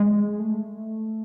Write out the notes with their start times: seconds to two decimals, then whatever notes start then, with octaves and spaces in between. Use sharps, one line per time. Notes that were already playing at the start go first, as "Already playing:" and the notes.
Already playing: G#3
0.39 A3